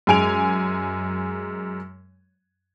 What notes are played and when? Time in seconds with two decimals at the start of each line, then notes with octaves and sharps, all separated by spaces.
0.07 F#2 G#3 G#5 D7 F7